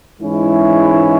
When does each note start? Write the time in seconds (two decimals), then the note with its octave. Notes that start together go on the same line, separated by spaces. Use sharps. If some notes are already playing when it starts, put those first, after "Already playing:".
0.21 G#2 E3 G#3 C#4 E4